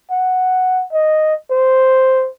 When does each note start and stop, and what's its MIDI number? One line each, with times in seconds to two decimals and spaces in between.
0.11 0.84 78
0.92 1.35 75
1.51 2.29 72